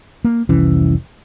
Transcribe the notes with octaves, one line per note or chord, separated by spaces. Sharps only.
A#3
F1 C2 E3 C#4